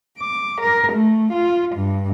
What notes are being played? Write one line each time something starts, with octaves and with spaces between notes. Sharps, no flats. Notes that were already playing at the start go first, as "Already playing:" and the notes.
D6
A#4
A3
F4
G2